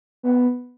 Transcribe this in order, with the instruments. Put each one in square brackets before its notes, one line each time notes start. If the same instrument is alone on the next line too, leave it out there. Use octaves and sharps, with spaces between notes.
[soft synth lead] B3